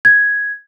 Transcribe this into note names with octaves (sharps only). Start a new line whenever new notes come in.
G#6